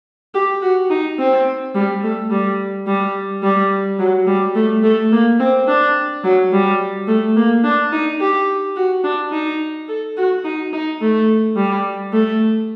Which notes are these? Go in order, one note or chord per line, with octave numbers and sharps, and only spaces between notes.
G4
F#4
D#4
C4
G3
A3
G3
G3
G3
F#3
G3
A3
A3
A#3
C4
D4
F#3
G3
A3
A#3
D4
D#4
G4
F#4
D4
D#4
A4
F#4
D#4
D#4
A3
G3
A3